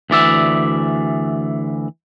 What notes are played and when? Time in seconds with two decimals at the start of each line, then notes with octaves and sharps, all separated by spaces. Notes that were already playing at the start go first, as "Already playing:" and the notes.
0.10 D2 E3 D5 E5